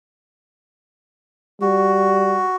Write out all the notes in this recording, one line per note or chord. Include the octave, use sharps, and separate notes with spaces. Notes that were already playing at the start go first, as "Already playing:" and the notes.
G3 F#4